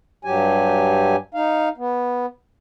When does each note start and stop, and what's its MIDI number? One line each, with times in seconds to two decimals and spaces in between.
0.25 1.16 43
0.25 1.16 54
0.25 1.16 67
0.25 1.16 80
1.34 1.69 63
1.34 1.69 77
1.78 2.26 59